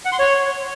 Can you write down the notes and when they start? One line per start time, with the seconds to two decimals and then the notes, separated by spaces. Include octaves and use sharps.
0.05 F#5
0.12 C6
0.19 C#5